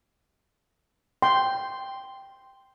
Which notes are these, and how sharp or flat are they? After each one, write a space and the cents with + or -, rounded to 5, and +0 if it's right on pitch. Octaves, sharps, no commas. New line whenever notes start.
G5 +0 C6 +0